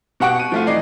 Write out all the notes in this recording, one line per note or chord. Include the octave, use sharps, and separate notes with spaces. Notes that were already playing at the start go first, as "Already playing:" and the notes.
B2 G4 F#5 C#6 D7
D#7
F3 A3 F4
E3 D#4 D5 C7